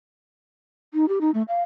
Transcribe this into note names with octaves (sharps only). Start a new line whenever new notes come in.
D#4
G4
D#4
A3
F5